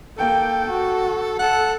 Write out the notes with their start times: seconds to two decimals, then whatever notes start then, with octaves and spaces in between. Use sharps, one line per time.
0.18 A#3 A4 G5
0.68 F#4
1.39 A4 F#5